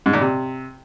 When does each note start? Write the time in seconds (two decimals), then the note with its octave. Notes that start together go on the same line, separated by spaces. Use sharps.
0.06 G#2
0.13 A#2
0.21 C3